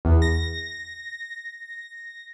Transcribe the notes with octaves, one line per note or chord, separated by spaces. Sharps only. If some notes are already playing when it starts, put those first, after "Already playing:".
E2
A#6